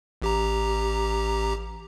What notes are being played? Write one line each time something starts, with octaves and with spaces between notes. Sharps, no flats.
A1 G4 A#5